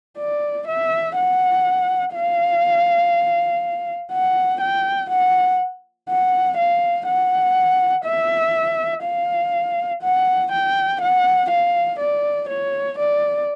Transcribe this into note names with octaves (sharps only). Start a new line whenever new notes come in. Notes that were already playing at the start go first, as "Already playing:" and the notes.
D5
E5
F#5
F5
F#5
G5
F#5
F#5
F5
F#5
E5
F5
F#5
G5
F#5
F5
D5
C#5
D5